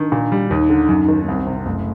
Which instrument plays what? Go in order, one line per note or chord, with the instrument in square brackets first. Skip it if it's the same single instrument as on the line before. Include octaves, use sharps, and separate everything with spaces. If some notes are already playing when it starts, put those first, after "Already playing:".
Already playing: [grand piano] D#3 [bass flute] D4
[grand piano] A#2
G3
[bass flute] F#4
[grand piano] D#2 [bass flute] D#4
[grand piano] D3
F#2
D#3
[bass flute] A#3
[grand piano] C2 [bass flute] C4
[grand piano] C3
[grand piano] F#1 [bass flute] A3